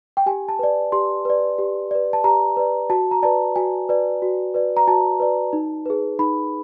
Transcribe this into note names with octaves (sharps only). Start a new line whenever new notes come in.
G5
G4 G#5
A5
B4 D5
G4 C6
B4 D5
G4
B4 D5
A5
G4 A#5
B4 D5
F#4 A5
A#5
B4 D5 A5
F#4 G#5
B4 D5
F#4
B4 D5
A#5
F#4 A5
B4 D5
D#4
G#4 B4
D#4 B5